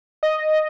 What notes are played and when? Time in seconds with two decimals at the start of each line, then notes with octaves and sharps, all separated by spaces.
0.23 D#5